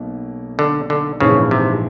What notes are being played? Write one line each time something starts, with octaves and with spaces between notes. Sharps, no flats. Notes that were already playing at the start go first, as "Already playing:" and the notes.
Already playing: B1 B2 A#3
D3
D3
A#1 G#2 C#3 E3
C3